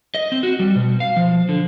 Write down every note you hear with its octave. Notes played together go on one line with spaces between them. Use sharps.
D#5
C4
F#4
G3
B2
F5
F3
D3